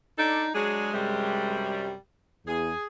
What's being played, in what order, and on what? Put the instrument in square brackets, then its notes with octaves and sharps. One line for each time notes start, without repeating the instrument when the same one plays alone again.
[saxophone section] D4 A4 D5 [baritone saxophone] D#4
[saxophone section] F#3 D4 G#4 [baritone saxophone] G#3
[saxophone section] F#2 C3 G3
[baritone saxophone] E2 [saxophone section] G#4